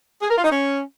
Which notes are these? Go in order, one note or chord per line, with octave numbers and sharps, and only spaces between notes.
G#4
A#4
F4
D#4
C#4